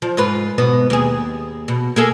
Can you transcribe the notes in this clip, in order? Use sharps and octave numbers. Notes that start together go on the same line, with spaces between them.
F3
G#2 F4 B4
G#2 B2 B3
D#2 G#4
B2
A#3 G#4 A4